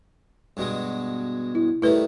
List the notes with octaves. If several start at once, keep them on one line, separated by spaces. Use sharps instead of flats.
G2 B2 G#3
E4
A2 D#3 G3 E4 B4